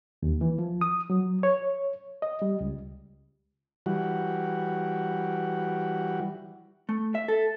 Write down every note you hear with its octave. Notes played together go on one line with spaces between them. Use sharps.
D#2
E3
F3
D#6
F#3
C#5
D#5
G3
C#2
E3 G3 F#4
A3
E5
A4